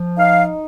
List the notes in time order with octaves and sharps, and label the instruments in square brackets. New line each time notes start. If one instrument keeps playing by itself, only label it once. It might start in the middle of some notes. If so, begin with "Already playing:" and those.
Already playing: [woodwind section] F3
D#4 F5